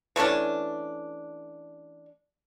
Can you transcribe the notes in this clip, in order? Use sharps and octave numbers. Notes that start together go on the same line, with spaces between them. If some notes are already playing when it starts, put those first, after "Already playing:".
E3 A3 C#4 D4